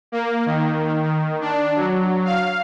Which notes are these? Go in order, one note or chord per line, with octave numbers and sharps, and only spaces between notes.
A#3
D#3
D#3
D4
F#3
F5